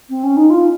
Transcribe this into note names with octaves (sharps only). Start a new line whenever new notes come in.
C4
C#4
D#4
F4